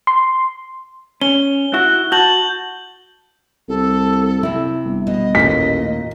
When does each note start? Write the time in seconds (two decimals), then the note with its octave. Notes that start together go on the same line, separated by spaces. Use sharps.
0.07 C6
1.22 C#4 G7
1.74 E4 F#4 F#6
2.12 F#4 A5 G6 F#7
3.68 C2 A4
4.43 C3 E4
4.85 G1
5.07 B2 D#5
5.35 A1 D#2 A#2 B6